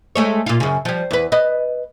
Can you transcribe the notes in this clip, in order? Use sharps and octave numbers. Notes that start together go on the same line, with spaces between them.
G#3 A3 C#5
A#2 F4
F#2 C#3
F3 G3
E2 B4
B4 D#5